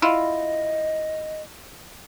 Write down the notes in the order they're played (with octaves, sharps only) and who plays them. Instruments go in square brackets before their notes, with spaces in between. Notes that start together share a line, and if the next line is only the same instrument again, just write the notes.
[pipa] E4 F4 [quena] D#5